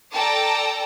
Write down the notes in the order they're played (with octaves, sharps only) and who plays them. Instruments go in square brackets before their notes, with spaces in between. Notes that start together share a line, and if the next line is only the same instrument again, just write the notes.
[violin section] A4 D5 G5 A5 A#5